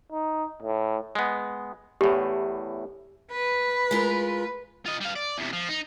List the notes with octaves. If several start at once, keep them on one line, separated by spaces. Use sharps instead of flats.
D#4
A2
G#3 B3
E2 A2 G4
B4
G#3 F4 A#4
F4 D#5
G3 F5
D5
E2 C3
F3
D#4